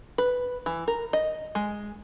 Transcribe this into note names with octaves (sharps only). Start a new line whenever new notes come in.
B4
E3
A#4
D#5
G#3